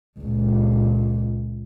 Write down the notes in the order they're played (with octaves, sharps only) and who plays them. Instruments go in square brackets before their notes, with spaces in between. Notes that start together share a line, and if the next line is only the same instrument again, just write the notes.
[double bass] C#2 A#2